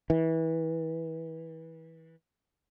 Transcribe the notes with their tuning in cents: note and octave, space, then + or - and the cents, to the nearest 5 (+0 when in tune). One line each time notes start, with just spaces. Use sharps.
E3 -25